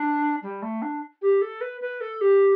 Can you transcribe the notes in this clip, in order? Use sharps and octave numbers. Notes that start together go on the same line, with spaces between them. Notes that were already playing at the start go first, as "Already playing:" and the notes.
Already playing: D4
G3
A3
D4
G4
A4
B4
B4
A4
G4